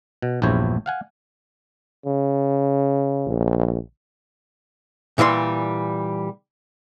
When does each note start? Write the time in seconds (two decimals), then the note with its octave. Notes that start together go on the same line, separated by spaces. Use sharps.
0.22 B2
0.42 A#1 E2 G2 E4 C5 C#5
0.86 F5 F#5 G#5
2.06 C#3
3.27 A#1
5.18 A#2 E3 G3 D5 C6